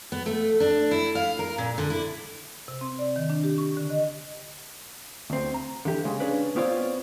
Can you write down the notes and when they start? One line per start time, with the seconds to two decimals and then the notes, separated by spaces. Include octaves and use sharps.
0.12 B3
0.26 A3
0.60 D4
0.91 E4
1.15 F5
1.39 A#4
1.58 A#2
1.78 D3
1.90 E4
2.68 C3
2.81 C4
2.99 D5
3.16 D#3
3.30 D4
3.44 G4
3.58 C#6
3.77 D3
3.90 D#5
5.30 D2 C4
5.54 A#5
5.85 D3 E3 G4
6.05 C#3 G#3
6.19 C#4 D4 G#4 B4 D5
6.56 B3 C4 F4 C#5 D5 F5